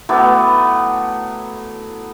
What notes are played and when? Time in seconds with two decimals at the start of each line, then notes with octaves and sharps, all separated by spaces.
0.09 A2 F#3 B3 D6